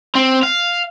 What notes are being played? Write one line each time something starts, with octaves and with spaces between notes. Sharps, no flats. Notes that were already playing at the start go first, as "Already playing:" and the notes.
C4
F5